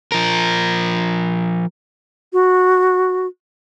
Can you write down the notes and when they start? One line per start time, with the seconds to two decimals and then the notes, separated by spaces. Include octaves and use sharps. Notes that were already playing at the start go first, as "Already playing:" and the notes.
0.12 F3 A#4
2.33 F#4